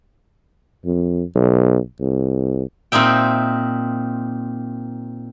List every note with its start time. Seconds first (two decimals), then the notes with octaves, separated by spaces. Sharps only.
0.85 F2
1.35 B1
2.00 C2
2.92 A#2 C4 D#4 E5 G5